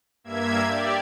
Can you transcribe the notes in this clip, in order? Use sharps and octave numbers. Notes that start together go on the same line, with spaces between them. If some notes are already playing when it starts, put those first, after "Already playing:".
G2 A#3 E5 G#6
G4 D5